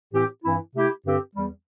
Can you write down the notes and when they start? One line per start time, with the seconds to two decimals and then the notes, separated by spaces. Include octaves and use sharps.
0.13 A2 E3 C4 G4
0.44 G2 E3 C4 E4
0.74 C3 A3 E4 G4
1.05 G2 D3 C4 G4
1.36 E2 E3 G3